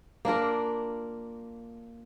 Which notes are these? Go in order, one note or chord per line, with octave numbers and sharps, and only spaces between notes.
A#3 D4 F4 A#4